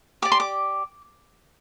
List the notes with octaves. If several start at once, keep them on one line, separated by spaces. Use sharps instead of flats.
G4 D5 D6
C6
D6